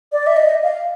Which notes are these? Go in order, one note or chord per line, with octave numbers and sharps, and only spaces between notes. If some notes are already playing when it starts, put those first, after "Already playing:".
D5
E5
D#5
F5